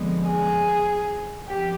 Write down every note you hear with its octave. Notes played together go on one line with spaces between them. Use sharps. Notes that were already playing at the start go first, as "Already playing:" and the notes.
Already playing: F2 D3 F3 G#3 B3
G#4
F2 G4